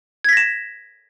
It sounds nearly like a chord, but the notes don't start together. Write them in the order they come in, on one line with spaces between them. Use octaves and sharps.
G#6 B6 A#6 E7